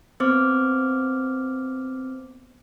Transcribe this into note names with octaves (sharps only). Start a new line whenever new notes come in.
B3 C4 C5 D6 F6